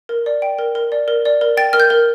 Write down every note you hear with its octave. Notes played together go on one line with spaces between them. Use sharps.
A#4
D5
G5
A#4
A#4
D5
A#4
D5
A#4
G5 A6
A#4 F6
G6
A#4